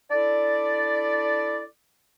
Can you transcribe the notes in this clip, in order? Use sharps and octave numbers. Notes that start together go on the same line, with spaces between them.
D4 E4 A4 D5